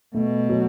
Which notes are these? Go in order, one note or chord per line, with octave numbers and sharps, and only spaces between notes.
B2 A3
F#3